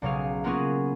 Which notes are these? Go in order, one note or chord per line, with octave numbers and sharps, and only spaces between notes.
B1 C#3 F#3 G#4 F5 F6
A#3 B3 C#4 F4 F#4 G#4